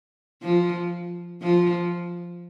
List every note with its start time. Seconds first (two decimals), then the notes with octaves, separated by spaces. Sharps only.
0.43 F3
1.42 F3